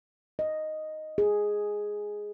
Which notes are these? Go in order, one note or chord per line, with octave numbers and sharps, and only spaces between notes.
D#5
G#4